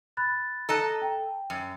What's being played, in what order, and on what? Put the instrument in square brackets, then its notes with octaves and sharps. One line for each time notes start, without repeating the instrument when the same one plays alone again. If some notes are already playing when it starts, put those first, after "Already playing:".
[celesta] B5 F#6 A6
[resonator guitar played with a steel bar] A4 D#5 A5 [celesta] A#5 F#6
[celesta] G5
[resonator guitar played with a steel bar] F#2